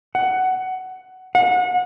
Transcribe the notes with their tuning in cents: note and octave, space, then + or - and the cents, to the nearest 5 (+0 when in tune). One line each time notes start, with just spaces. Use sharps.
F#5 +15
F#5 -35